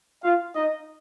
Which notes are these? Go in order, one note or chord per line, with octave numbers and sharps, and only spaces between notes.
F4 F5
D#4 D#5